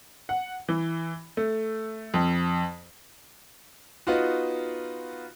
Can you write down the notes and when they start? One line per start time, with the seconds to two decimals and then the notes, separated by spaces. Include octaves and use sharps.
0.29 F#5
0.69 E3
1.37 A3
2.14 F2
4.07 B3 D#4 F4 F#4